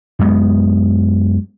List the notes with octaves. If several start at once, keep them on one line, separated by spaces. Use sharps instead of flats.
F#2 G#3 B3